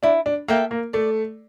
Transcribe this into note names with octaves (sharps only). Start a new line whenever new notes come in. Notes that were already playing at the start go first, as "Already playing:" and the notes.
D4 E4
D4
A#3 A4 E5 G5
A#3
A3 D5